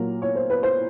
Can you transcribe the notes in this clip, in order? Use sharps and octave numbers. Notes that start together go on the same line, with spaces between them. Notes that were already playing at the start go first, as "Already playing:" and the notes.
Already playing: A#2 F#3 A#4
C#5
C5
B4
C5